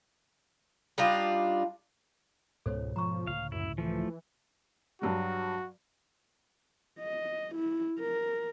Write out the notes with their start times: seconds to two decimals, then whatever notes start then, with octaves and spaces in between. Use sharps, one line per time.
0.98 G3 D4 D#4 F4
2.66 C#2 G#2 B2 B3 A4 C5 C#5
2.96 F3 A#5 C#6
3.27 C#2 A2 D3 F5
3.52 F#2 E4
3.78 E3 F3 A3
5.02 G2 F#3 G3 F#4
7.00 D#5
7.55 E4
7.99 A#4